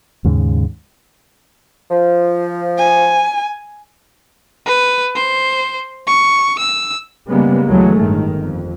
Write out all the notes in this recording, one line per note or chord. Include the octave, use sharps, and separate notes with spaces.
D#2 G#2 C#3
F3
G#5
B4
C5
C#6
E6
C#3 G3 G#3 A#3 B3
D2 E3 F#3 G#3 A3
G1 A2 D#3
F2